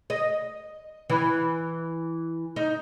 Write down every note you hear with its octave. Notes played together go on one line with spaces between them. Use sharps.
D#5
E3
D#4